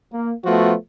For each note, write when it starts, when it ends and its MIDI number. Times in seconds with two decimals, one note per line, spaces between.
0.13 0.33 58
0.45 0.74 53
0.45 0.74 57
0.45 0.74 59
0.45 0.74 66